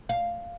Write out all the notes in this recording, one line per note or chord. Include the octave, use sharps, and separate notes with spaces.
F5